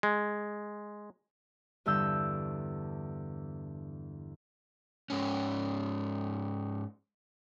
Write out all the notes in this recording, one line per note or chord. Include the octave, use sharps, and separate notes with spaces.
G#3
E2 G2 D3 E6 G6
G#2 C#4